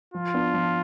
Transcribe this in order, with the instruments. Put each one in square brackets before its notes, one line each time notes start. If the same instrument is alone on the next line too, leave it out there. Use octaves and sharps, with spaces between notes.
[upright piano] F3 [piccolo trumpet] F4
[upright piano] B3 D4
F3